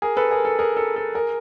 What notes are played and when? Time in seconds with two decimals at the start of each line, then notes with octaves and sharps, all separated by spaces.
0.02 G#4 A#4
0.17 A4 B4
0.31 G#4 A#4
0.45 A4
0.59 G#4 A#4
0.77 A4
0.96 A4
1.15 G#4 A#4